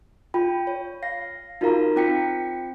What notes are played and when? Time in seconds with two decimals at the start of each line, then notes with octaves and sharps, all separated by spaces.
0.34 F4 G5 B5
0.67 C#5
1.03 F5 A#6 C7
1.61 D#4 F4 F#4 A#4 F5 A#5
1.96 C4 F4 G5 B6 C#7